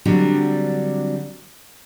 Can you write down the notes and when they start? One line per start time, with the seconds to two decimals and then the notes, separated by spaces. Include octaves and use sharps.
0.05 D3 F#3 G3 C4 D4